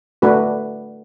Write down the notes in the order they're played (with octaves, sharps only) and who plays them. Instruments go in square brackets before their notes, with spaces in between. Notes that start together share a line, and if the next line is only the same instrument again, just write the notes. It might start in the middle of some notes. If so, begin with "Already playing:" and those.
[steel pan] A3 D4 F#4 B4